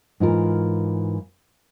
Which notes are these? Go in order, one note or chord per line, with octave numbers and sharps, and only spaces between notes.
G#2 E3 F4 A#4